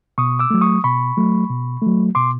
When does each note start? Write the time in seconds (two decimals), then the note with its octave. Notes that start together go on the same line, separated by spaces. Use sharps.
0.18 B2 C#6 D#6
0.39 D6 E6
0.50 F#3 A3
0.61 C#6 D#6
0.84 B2 B5 C#6
1.17 F#3 A3
1.50 B2
1.82 F#3 A3
2.15 B2 C6 D6